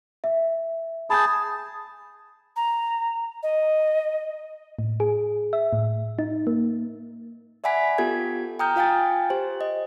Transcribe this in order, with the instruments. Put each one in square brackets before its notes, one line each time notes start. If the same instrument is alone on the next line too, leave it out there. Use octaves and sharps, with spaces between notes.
[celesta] E5
[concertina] G#4 A5 [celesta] B5 D#6 G6
[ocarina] A#5
D#5
[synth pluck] A2
G#4
E5
A2
D#4
A#3
[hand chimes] D5 E5 F#5 G#5 B5 B6
B3 F4 G4 A4 G#6
G5 A#5 D#6 F6 G6
F4 F5 G5 G#5 A6
G4 C5
D#5